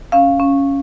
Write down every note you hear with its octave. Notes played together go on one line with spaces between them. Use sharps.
C#4 F5
C#4